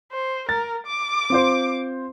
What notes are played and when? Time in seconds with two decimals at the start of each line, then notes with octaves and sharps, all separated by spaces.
0.12 C5
0.49 A#4 A6
0.86 D6
1.30 C4 F4 C5